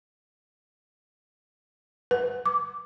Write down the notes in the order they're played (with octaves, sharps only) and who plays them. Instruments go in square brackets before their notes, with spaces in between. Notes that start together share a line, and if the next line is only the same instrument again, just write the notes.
[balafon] B4
D6